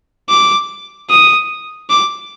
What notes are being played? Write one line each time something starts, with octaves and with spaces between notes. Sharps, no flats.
D6
D#6
D6